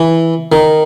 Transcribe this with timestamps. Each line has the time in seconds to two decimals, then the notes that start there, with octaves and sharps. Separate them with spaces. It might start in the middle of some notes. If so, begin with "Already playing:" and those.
Already playing: E3
0.52 D#3